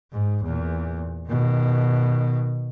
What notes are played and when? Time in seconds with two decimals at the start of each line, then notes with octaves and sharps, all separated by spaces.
0.12 G#2
0.44 E2 A#2
1.28 B2 D#3